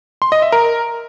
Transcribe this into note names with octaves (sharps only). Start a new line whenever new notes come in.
C6
D#5
E5
A#4